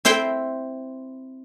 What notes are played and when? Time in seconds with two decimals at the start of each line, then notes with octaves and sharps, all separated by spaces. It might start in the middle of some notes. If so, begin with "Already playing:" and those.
0.05 C4 E4 C5 G5